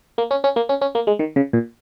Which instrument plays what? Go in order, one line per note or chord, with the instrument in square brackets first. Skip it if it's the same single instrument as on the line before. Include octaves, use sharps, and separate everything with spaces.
[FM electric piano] A#3
C#4
C#4
A#3
C#4
C#4
A#3
G#3
D#3
C#3
A#2